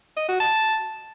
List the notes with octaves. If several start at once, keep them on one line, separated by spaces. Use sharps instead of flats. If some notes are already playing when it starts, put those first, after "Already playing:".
D#5
F#4
A5